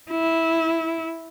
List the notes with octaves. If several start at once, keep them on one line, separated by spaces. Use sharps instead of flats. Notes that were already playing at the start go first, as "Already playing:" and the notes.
E4